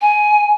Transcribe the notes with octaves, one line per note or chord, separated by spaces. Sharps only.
G#5